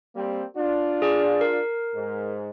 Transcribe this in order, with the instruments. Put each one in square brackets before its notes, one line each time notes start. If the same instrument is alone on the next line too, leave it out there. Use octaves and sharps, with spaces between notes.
[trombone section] G3 A#3 C4
D4 F4
[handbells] G#4 D5
A#4
[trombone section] G#2